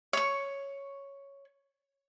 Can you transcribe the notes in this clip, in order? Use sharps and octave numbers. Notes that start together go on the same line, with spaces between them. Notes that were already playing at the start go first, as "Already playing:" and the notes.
C#5 C#6